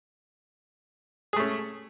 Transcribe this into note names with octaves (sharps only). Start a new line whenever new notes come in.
A3 C#4 G#4